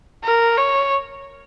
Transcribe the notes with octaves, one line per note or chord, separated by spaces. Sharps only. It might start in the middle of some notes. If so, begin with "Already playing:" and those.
A#4
C#5